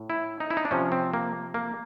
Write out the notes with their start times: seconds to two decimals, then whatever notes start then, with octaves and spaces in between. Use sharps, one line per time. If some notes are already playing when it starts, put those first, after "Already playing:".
Already playing: A2
0.10 E4
0.40 D#4
0.50 E4
0.57 D#4
0.65 D4
0.71 C3 F3 C#4
0.92 C4
1.14 A#3
1.54 A#3